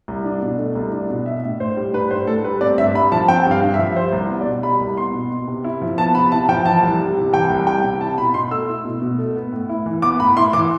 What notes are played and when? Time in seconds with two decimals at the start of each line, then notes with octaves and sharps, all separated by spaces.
0.08 C2
0.25 D4
0.42 B2
0.58 A3
0.75 C2
0.92 D4
1.10 B2
1.26 D4 E5
1.43 A2
1.60 A2 C5
1.77 G3
1.93 D4 B4
2.11 A2 C5
2.27 A2 A4
2.44 G3 B4
2.61 C4 D5
2.78 G2 E5
2.95 G2 B5
3.12 F3 A5
3.28 C4 G5
3.46 G2
3.51 F5
3.62 G2
3.74 E5
3.79 F3
3.96 G3 C5
4.13 C2
4.30 B3
4.41 D5
4.46 B2
4.63 G3 B5
4.80 C2
4.97 B3 C6
5.14 B2
5.31 B3
5.47 C3
5.64 E4
5.81 F3
5.98 B3 A5
6.15 C3 B5
6.32 E4 A5
6.49 F3 G5
6.65 E3 A5
6.83 C2
7.00 G3
7.17 C3
7.33 E3 G5
7.50 C2
7.67 G3 G5
7.84 C3
8.01 E4 A5
8.18 B2 B5
8.34 B2 C6
8.51 A3 E6
8.68 E4
8.85 B2
9.02 B2
9.18 A3
9.36 B3
9.52 A2
9.69 E4
9.86 E3
10.02 B3 D6
10.19 A2 B5
10.37 E4 C6
10.53 E3 D6